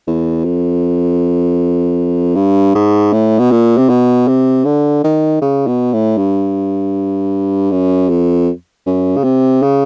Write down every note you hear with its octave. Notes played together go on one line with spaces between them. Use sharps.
E2
F2
G2
G#2
A2
B2
A#2
C3
B2
C3
D3
D#3
C#3
B2
A2
G2
F#2
F2
F#2
C#3
C3
C#3